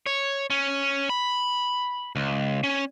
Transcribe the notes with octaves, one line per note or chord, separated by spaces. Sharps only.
C#5
C#4
B5
C#2
C#4